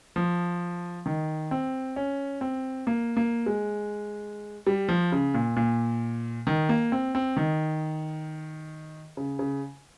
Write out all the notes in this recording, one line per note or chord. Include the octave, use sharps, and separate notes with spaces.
F3
D#3
C4
C#4
C4
A#3
A#3
G#3
G3
F3
C#3
A#2
A#2
D#3
A#3
C4
C4
D#3
C#3
C#3